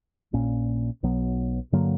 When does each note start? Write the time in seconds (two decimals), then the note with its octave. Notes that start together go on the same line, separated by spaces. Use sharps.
0.33 A#1 A#2 A#3 C#4
1.03 B1 B2 F#3 B3
1.72 G2 D3 F#3 A#3